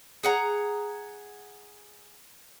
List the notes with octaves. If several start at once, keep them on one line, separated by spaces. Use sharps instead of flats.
G#4 F#5 A#5